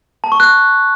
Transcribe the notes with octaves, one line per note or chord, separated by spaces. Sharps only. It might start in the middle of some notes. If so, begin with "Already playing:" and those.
A5
C#6
F#6